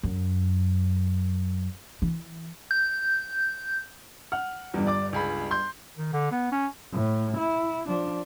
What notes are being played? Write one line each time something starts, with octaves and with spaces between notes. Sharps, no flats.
F#2
E3
G6
F#5 F6
G1 E2 G3
D5 D6
C#2 G#4 B5
C6 G6
D#3
D3
B3
C#4
A2
E4
F3 D4